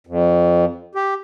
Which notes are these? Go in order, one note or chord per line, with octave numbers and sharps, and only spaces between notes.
F2
G4